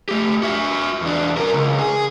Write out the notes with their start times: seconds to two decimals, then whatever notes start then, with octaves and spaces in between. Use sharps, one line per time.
0.09 A3 G4
0.43 F#4 E5
1.02 E2 D4
1.37 F#4 A#4
1.54 C#2
1.79 G#4